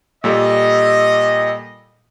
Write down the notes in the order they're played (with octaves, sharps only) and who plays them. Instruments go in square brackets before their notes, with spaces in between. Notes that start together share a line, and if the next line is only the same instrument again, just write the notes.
[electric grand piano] A#2 G3 A4 [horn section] D#5